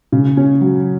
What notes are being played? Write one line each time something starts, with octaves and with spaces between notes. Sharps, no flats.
C#3
C#4
F#3